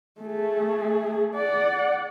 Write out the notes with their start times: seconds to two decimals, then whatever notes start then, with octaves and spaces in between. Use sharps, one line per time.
0.21 A3 G#4
1.35 D5 F#5